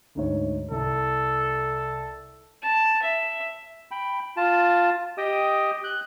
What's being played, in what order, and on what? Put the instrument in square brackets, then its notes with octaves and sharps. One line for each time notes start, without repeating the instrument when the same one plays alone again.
[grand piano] D2 G#2 C#5
[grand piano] C2 [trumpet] A4
[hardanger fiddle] A5
E5
[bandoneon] G5 B5
F4 A5
G4 D#5 G5 D#6
F#6 G6